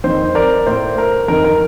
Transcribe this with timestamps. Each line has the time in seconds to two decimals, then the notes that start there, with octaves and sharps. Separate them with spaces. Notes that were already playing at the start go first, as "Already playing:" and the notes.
0.04 F2 D#3 C5
0.35 A#4 D5
0.67 A2 C5
0.98 A#4
1.28 F2 D#3 A#4
1.44 A#4